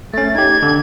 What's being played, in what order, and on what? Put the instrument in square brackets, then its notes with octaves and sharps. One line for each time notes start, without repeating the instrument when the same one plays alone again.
[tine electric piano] A3 C#4 [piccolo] A6
[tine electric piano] D#4 G4 [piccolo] G#6
[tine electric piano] D3